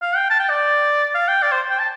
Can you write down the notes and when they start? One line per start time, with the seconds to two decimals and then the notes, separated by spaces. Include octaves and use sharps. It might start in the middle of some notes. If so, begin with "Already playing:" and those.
0.02 F5
0.16 G5
0.30 A5
0.39 G5
0.49 D5
1.15 F5
1.28 G5
1.43 D5
1.52 C5
1.70 G5
1.79 A5